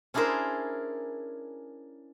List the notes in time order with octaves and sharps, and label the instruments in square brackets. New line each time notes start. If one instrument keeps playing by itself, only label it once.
[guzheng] C#4 D4 E4 G#4 A#4 C5